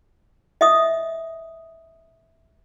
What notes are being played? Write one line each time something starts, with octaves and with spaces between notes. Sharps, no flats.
D#5 E5 D#6